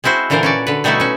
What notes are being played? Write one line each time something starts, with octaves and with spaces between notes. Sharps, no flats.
G#3 C4 E4 F#4 C5
A#2 D3 E3 A#4 C5 D5
C#4 F#4 D5
D3 B4
B2 G3 A3 D#4 E4 F#4
C#4 F#4